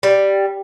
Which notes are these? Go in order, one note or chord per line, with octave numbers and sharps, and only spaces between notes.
G3